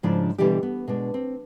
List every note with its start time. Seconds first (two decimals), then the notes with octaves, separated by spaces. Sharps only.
0.03 G#2 C#3 F3 D4 E4 D5
0.38 B2 D3 E3 G3 D4 G4
0.63 B3
0.88 B2 G#3 D4
1.14 C4